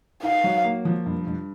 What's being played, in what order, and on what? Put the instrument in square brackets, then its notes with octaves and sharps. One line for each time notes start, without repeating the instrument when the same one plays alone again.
[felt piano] D#4 [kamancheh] F5
[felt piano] F#3
A#3
F3
G2
G2